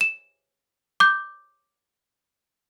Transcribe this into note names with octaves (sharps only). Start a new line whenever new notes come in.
E7
D6 G6